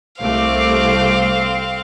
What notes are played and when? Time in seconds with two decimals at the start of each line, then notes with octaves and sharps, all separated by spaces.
0.20 C2 A3 C4 F5 D6